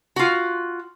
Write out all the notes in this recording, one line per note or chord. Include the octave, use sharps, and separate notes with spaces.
F4 F#4